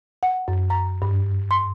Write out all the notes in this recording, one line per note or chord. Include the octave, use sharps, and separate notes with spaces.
F#5
F#2
A#5
G2
C6